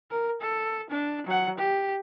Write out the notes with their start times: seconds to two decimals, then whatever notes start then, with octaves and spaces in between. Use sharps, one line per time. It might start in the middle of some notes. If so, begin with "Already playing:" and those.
0.10 A#4
0.41 A4
0.90 D4
1.26 F#3 F#5
1.58 G4